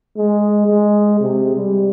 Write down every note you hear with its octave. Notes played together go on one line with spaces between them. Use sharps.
G#3
G#3
C3
G3